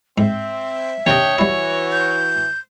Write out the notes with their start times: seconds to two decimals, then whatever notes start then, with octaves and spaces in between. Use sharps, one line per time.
0.18 G#2 C4 E5
1.07 D#2 C3 D4 C#5 D#5 G5
1.38 E3 G3 E4 F#4
1.92 G6